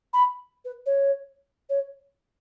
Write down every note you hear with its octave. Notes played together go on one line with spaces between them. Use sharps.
B5
B4
C#5
C#5